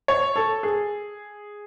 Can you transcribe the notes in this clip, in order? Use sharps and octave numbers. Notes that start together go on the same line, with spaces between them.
C#5
A4
G#4